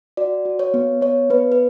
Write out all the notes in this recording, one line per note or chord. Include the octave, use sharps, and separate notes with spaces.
F#4 D5
F#4
C#5
B3
B3 C#5
B3 B4
B4